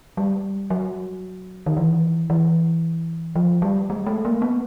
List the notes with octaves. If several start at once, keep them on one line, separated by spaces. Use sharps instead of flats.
G3
F#3
D#3
E3
E3
F3
G3
G#3
A3
A#3
B3